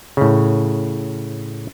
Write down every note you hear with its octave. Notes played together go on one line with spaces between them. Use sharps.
A2 C#3